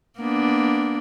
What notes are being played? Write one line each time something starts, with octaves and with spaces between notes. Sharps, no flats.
A#3 B3 D4